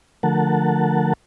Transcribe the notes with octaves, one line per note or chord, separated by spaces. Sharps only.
D3 F3 A3 A#4 F#5 A5